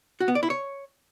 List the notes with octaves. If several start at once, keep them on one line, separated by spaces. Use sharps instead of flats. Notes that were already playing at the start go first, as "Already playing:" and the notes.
F#4
B3
D5
E4
C#5